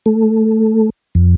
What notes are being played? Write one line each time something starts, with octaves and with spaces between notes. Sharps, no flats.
A3
F2